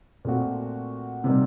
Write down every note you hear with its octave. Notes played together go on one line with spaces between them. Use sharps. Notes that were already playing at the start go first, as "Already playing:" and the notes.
A#2 A3 C4 F#4
C3 D#3 G3 A#3